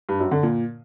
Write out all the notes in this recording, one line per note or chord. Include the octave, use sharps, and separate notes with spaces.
G2
F#2
D3
A#2